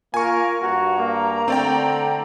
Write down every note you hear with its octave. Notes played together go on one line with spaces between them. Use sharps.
A#3 F4 A#4 G#5 C#6
G2 F#4 A#5
A#3
D3 A3 C4 D5 G5